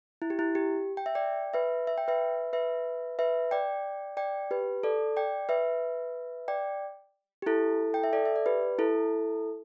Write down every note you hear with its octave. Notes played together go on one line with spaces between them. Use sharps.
E4
G4
E4
G4
G5
E5
D5 G5
B4 E5
E5
G5
B4 E5
B4 E5
B4 E5
D5 G5
D5 G5
G4 B4
A4 D5
D5 G5
B4 E5
D5 G5
G4
E4 A4
G5
E5
A4 D5
E5
D5
G4 B4
E4 A4